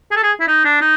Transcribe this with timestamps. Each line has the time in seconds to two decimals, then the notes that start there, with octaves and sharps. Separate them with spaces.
0.11 G#4
0.16 A4
0.23 G#4
0.40 E4
0.47 D#4
0.65 D4
0.81 D#4